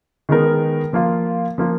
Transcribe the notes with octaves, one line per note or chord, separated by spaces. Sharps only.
D#3 G#3 B3 D#4 A#4
F3 A#3 F4
F3 A#3 F4